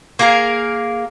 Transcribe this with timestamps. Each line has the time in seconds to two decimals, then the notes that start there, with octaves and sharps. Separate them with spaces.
0.19 A#3 G#4 A#4